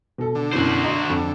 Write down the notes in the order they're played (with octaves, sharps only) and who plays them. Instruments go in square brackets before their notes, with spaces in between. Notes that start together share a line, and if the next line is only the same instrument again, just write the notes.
[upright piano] B2 A4
[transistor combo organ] D3
[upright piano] F#2 B2 E3 [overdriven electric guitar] F#4 C5
[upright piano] D#5 A#5 C6
F2